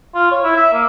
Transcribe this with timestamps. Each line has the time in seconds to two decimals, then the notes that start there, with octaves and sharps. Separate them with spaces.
0.15 F4
0.32 C#5
0.44 E4
0.56 E5
0.73 A#3